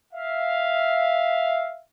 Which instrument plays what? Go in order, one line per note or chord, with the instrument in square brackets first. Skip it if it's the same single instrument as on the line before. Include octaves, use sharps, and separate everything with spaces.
[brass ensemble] E5 F5